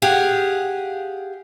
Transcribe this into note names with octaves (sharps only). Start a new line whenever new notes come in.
G4 G#4 F5 F#5